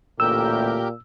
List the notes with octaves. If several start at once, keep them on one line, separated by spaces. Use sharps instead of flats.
A1 D2 A#2 A3 G4 A#4 E6 G6